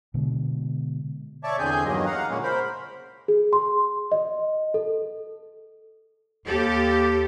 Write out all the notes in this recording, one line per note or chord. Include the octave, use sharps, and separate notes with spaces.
B2 D3 G#3 B3
C#5 D5 E5 A5 C#6 D6
E2 D3 C4 G#4 G#5 G6
E2 G2 D#3 F#3 A#3 D#5
F5 F#5 A#5
A#2 C#3 G#3 A#3 C#4
A#4 C5 B5
G#4
C6
D#5
A4
D#2 G4 A4